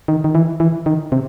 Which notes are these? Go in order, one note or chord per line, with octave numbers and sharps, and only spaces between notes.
D#3
D#3
E3
E3
D#3
C3